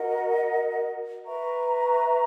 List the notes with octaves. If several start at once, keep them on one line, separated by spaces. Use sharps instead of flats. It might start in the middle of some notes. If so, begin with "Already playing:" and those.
Already playing: F#4 A#4 D#5 F#5
B4 E5 A#5 C#6